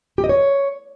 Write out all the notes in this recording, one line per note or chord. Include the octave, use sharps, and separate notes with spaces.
G4
D#5
C#5